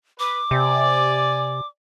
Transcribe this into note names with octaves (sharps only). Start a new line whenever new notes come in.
B4 D6
C3 D5 G#5